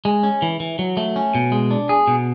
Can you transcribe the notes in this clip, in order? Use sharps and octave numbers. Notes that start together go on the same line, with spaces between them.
G#3
C#4
E3
E3
F#3
A3
C#4
B2
G#3
D4
G#4
B2